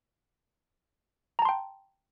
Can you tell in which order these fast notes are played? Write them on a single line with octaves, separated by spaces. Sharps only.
A#5 A5 C6 G5